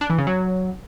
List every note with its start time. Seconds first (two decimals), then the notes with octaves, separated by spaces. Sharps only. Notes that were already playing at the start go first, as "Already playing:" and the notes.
0.01 D4
0.10 E3
0.18 C#3
0.27 F#3